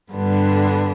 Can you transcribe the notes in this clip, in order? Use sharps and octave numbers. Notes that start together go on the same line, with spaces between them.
G2 D3 G3 B3 D4